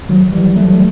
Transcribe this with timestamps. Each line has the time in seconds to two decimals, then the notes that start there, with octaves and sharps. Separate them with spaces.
0.09 D#3 F#3
0.32 E3 G3
0.56 F#3 A3